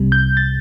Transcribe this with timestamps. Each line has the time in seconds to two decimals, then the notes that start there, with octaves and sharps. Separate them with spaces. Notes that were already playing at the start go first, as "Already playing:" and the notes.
Already playing: C2 C3 G3
0.12 G6
0.37 A6